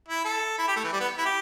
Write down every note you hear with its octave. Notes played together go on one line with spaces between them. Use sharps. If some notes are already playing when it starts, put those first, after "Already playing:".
E4
A4
E4
G4
A3
E3
G3
B3
E4
G4